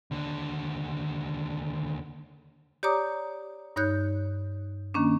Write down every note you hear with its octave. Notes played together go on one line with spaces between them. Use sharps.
D#2 D3
G4 C#5 D5 A#5 D6 D#6
G2 D#4 C#5 F#6 G6
D#3 A#3 C#4 D4